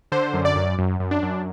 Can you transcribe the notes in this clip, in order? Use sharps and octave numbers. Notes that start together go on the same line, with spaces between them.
D3 C5
F#2
D5
F#2
F#2
F#2
D4
F#2